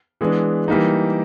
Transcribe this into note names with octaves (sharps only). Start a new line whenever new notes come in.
E3 G#3 B3 D4
E3 G3 A#3 D#4